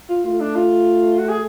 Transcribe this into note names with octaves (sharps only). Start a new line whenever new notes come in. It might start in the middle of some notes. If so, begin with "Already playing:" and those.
F4
A3 F4
D4
F4
F#4
G#4